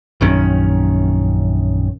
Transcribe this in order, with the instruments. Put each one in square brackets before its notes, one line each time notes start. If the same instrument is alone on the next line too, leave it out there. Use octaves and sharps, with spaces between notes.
[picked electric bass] A#1 F#2 D#3 C#4